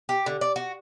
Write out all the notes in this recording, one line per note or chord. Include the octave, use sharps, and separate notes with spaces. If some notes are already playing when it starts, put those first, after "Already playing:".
G4
D3
D5
F#4